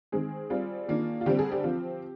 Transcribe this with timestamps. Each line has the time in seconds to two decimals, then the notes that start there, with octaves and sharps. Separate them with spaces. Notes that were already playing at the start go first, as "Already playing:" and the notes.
0.12 D#3 G#3 C4 G#4
0.50 G3 C4 F4
0.88 D#3 A#3 D4 F4
1.21 F4
1.26 D3 G3 C4 G4
1.39 G#4
1.52 G4
1.64 F3 C4 F4